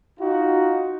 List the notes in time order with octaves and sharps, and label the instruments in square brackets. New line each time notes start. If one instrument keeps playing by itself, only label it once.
[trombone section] D#4 F4 F#4